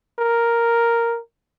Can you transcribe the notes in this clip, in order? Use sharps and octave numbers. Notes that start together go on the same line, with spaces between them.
A#4